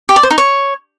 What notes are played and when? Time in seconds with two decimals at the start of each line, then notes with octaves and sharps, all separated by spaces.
0.09 G4
0.16 D5
0.23 C5
0.31 D#4
0.38 C#5